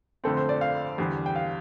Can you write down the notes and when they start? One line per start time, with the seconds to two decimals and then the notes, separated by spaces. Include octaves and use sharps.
0.24 F2 D3 A3 C4 A4
0.37 C5
0.49 D5
0.61 F5
0.98 E2 D3 G3
1.26 G5
1.36 F5